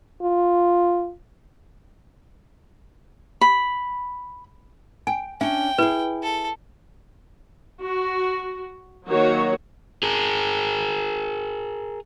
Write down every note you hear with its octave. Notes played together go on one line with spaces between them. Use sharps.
F4
B5
G5 G#5
C#4 D4 E5 G5
E4 G#4 B4
A4
F#4
D#3 F#3 A#3 F#4 C#5
G#4 A#4